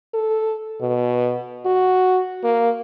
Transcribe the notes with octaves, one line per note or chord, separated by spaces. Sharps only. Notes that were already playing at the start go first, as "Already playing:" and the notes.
A4
B2
F#4
A#3